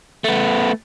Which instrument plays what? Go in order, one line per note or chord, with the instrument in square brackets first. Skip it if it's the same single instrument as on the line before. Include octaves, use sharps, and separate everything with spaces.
[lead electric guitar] A3 B3